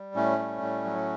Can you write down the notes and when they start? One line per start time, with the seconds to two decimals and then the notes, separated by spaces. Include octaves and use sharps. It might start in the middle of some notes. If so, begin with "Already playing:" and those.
Already playing: G3
0.15 A2 A3 C#4
0.39 G3
0.62 A2
0.85 F#3